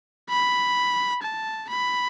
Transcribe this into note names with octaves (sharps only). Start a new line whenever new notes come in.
B5
A5
B5